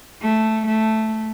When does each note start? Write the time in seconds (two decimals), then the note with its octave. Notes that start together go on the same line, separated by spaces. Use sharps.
0.22 A3
0.66 A3